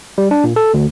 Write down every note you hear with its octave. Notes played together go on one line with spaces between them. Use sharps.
G3
D4
A#2
A4
D2